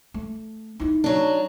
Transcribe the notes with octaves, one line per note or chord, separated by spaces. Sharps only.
A3
D#4 E4
F#3 D4